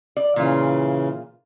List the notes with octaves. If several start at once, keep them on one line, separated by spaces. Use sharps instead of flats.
D5
A#2 C#3 E3 F4